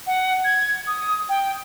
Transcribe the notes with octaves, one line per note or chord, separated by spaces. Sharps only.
F#5
G#6
D#6
G5